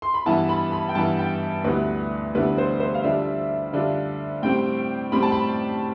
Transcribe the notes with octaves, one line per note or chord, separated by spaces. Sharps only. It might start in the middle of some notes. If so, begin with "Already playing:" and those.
C6
B5
G2 E3 B3 E4 A5
B5
B5
G5
G2 E3 B3 E4 A5
G5
D2 D3 G3 B3 E4 B4
D2 D3 G3 B3 E4 B4
C5
C5
F5
D3 G3 D4 F4 E5
D3 G3 D4 F4
A2 G3 C4 G5
A2 G3 C4 B5
A5
B5